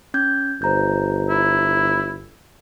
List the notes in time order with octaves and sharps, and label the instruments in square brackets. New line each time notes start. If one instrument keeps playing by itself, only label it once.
[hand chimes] C#4 G6 G#6
[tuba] G1 [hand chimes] C5 A#5 G6
[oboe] E4